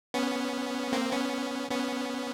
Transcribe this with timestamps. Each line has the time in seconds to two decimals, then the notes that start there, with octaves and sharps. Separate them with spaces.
0.14 B3 C#4
0.93 A#3 C4
1.12 B3 C#4
1.71 B3 C#4